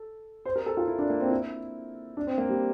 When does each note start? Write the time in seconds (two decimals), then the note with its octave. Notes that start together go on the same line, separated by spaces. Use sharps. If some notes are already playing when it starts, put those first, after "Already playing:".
Already playing: A4
0.45 C5
0.56 A#4
0.66 A4
0.77 F4
0.87 E4
0.99 D4
1.10 A#3
1.20 C4
1.31 E4
2.17 D4
2.27 C4
2.38 A#3
2.49 G3